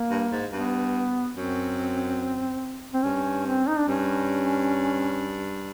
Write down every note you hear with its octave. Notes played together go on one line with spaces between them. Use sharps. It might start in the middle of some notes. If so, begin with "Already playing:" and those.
Already playing: A#3
G2
G#2
G2 B3
F#2 C4
C4
G2 C#4
C4
D#4
D4
G2 C#4